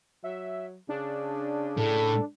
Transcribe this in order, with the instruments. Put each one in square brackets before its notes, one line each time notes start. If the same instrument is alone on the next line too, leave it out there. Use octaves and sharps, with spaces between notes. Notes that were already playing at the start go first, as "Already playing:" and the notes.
[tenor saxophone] F#3 [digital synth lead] E5
[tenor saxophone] C#3 [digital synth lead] D4
[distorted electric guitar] A2 [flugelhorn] A4